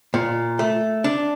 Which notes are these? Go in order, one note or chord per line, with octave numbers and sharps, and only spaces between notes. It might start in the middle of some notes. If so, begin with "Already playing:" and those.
A#2
A3
D4